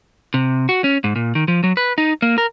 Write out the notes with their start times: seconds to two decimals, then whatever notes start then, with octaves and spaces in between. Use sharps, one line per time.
0.34 C3
0.69 F#4
0.84 C#4
1.04 G#2
1.16 A#2
1.35 D#3
1.48 F3
1.64 F#3
1.77 B4
1.98 D#4
2.22 A#3
2.38 A#4